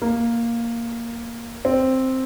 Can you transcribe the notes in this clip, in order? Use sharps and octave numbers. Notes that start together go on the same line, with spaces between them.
A#3
C4